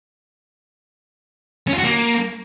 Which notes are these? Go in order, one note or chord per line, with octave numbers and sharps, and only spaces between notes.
C#4
F4
F#4
A#3